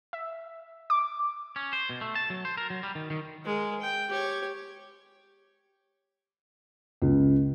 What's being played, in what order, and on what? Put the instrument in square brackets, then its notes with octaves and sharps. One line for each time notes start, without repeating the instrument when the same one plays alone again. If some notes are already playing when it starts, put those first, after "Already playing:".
[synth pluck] E5
D6
[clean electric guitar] C#4
C5
B2
A3
A5
F#3
C5
A#4
F#3
G3
D#3
D#3
[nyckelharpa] G#3 A#4
G5
G4 C#5
[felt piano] C#2